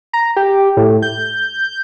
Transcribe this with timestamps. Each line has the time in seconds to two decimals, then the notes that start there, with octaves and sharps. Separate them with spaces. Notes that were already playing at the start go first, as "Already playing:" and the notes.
0.13 A#5
0.37 G4
0.77 A2
1.02 G6